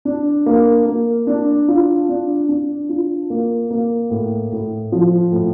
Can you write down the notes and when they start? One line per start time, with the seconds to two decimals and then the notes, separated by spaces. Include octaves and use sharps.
0.05 D4
0.46 A#3
0.86 A#3
1.27 D4
1.68 F4
2.09 D4
2.49 D4
2.89 F4
3.30 A#3
3.71 A#3
4.11 A2
4.52 A2
4.92 F3
5.32 A2